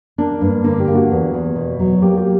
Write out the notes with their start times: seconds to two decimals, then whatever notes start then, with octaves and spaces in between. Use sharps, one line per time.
0.18 A#3 D4
0.41 G2
0.64 D3 A#3
0.80 G4
0.88 A#3
0.95 F#4
1.11 E2
1.34 E2
1.56 B2
1.79 F#3
2.02 A#3 G4
2.18 G4